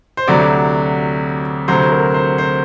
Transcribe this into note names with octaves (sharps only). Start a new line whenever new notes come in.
C5
D2 C3 F#3 D5
D2 C3 F#3 C5
A#4
C5
C5